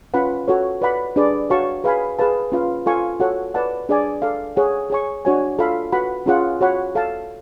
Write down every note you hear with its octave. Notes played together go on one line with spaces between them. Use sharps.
C#4 F4 B4 F#5 B5
F#4 A4 C#5
B4 D5 F#5 B5
D4 G#4 B4 D5
F#4 C#5 F5 A5 C#6
G#4 B4 F5 G#5 B5
G#4 B4 F5 A5
C#4 F4 B4 F5
F4 A4 F5 G#5 C#6
F#4 A4 C#5 F#5
B4 D5 F#5 A5
D4 G#4 D5 G#5
A4 D5 F5
G#4 C#5 F#5
G#4 C#5 G#5 C#6
D4 F#4 C#5 G#5
F4 A4 F5 B5
F#4 B4 F#5 B5
C#4 F4 G#4 C#5 F#5
F#4 C#5 F#5 B5
A4 F5 A5